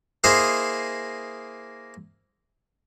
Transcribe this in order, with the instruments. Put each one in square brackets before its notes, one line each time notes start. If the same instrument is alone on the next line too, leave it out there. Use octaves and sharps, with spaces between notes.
[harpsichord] A#3 E4 G#4 C5 D#5